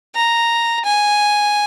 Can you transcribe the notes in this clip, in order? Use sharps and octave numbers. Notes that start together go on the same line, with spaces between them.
A#5
G#5